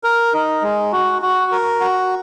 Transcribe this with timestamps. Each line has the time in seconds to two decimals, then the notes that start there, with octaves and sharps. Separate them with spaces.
0.04 A#4
0.33 D#4
0.62 G#3
0.93 F#4
1.22 F#4
1.52 A#4
1.80 F#4